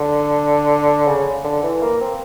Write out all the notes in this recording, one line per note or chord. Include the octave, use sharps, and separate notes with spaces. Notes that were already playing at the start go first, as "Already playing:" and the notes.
Already playing: D3
C#3
D3
E3
A#3
C4